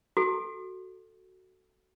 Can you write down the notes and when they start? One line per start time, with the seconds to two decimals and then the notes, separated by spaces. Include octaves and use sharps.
0.17 F#4 A4